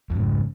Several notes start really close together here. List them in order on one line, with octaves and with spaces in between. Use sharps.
F2 G#2 C#3